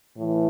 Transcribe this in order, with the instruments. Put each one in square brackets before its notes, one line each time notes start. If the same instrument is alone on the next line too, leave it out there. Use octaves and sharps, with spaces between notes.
[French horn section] A2 E3